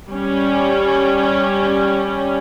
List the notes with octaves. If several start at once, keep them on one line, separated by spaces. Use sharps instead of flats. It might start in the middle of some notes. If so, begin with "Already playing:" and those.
G3 C#4